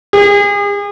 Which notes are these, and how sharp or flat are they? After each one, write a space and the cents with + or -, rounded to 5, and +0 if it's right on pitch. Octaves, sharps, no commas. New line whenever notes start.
G#4 -40